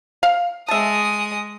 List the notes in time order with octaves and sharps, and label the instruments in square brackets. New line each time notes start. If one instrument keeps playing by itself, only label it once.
[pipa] F5
[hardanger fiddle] G#3 D#6 [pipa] E5 A5